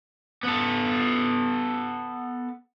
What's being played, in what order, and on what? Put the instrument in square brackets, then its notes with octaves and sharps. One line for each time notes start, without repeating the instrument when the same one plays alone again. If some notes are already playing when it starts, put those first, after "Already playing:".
[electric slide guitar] B3 A4